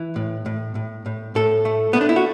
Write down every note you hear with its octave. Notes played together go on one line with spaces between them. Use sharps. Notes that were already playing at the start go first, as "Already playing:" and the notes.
Already playing: E3
A2
A2
A2
A2
A2 A4
A3
A3 B3
D4
E4
F#4